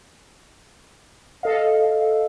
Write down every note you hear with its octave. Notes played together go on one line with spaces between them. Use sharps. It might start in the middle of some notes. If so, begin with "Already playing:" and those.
A4 D#5 F5